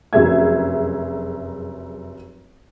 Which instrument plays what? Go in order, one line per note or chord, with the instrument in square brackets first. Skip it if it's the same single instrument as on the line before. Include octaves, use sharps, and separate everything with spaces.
[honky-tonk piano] F1 F#2 G#4 E5 G#6